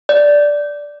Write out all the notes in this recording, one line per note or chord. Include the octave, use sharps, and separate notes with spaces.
D5